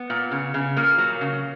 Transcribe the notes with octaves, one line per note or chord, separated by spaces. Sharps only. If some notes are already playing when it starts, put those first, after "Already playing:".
Already playing: B3
A#2
C#3
C#3
A#2 A#3
F#3
C#3